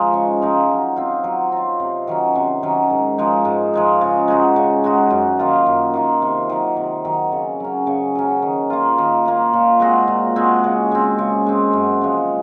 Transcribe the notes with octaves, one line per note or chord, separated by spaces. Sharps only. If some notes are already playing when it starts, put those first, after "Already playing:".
Already playing: F3 G#3 D#4
C#3
F3 G#3 D#4
F#3
C4 F4
F#3
C4 F4
C3
D#3 F#3 C#4
C3
D#3 F#3 C#4
G#2
F3 G#3 D#4
G#2
F3 G#3 D#4
C#3
G#3 D#4 F#4
C#3
G#3 D#4 F#4
F#2
D#3 A#3 F4
F#2
D#3 A#3 F4
C3
D#3 F#3
C3
D#3 F#3
C#3
F#3 C#4
C#3
F#3 C#4
D#3
A#3 F4
D#3
A#3 F4
A#2
G#3 C4 F#4
A#2
G#3 C4 F#4
C#3
G#3 C4
C#3
G#3 C4
F#2
C#3 F3 G#3